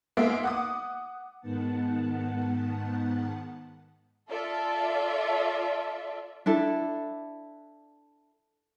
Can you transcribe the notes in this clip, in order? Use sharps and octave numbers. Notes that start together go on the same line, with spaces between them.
G#3 A#3 B3 E5
F#5 D6 D#6
G#2 D#3 B3 F#5 A5
F4 A4 D5 E5
D4 E4 A4